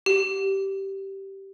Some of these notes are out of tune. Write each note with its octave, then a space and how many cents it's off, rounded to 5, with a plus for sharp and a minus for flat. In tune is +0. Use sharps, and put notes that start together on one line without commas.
G4 -15